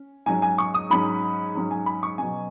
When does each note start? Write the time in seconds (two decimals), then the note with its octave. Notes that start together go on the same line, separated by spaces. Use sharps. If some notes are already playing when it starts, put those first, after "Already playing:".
Already playing: C#4
0.26 G#2 F#3 C#4 G#5
0.42 G#5
0.58 C#6
0.74 D#6
0.90 G#2 F#3 C#4 B5
1.55 G#2 F#3 C#4
1.71 G#5
1.86 B5
2.03 C#6
2.18 B2 F#3 C#4 G#5